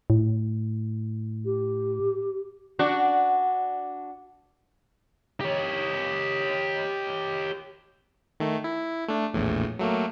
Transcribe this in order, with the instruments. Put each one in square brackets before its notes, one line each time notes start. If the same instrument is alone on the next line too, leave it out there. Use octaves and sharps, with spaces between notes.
[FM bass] A2
[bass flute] G4
[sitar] D4 F#4
[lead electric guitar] G4 C#5
[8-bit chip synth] D#3 A3
E4
A3 D4
A#1 E2 A2
F#3 A3 A#3